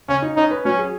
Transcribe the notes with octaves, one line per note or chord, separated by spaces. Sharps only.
C#3 C#4
D#4
C#4 D#4
B4
F#3 C#4
G#4